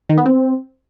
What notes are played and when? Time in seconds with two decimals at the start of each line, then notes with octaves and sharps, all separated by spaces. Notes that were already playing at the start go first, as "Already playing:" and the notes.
0.09 D#3
0.18 B3
0.26 C4